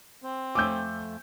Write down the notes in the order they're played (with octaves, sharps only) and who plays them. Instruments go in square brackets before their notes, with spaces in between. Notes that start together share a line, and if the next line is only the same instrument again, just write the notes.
[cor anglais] C4
[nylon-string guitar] F2 A3 G#5 [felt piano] D6 E6 G6